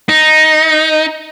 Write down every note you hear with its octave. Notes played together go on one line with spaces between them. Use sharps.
D#4